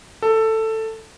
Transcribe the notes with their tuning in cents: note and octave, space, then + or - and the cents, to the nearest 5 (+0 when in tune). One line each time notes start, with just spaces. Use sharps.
A4 +10